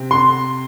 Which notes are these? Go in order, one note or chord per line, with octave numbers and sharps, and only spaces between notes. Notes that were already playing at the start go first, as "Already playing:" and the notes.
Already playing: C3 C4
C6